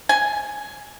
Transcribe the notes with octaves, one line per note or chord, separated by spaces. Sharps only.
G#5